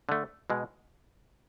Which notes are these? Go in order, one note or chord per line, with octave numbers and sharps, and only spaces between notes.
D3 A3
B2 G#3